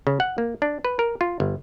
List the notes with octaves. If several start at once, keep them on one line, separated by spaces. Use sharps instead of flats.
C#3
F#5
A#3
D4
B4
A#4
F4
G1